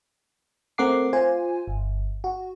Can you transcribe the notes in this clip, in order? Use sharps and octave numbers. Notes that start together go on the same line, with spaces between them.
A3 C4 A#4 F#5 D6 C7
F4 C5 G#5
G1
F#4